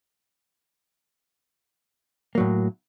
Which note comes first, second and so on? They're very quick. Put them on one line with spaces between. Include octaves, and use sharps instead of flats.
A#3 F#3 A2